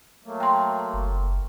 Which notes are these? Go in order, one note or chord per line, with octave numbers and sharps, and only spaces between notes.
F#3 A3 A#3
G5 C6
F#1